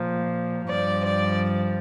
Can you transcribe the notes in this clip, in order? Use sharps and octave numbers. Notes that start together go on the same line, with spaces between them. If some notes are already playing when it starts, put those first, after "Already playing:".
Already playing: A#2 F3
G2 F3 D5
D5